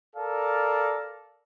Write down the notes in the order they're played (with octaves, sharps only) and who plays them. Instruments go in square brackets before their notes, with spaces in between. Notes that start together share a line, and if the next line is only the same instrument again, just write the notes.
[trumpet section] A4 A#4 D5 F5